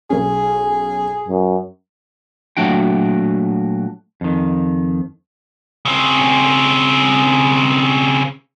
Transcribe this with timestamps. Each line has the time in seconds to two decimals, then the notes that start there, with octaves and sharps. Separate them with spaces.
0.10 B1 C#4 G#4
1.28 F#2
2.57 A#2 F#3 A3 D4 F#4 G5
4.21 F2 D#3
5.85 C#3 C4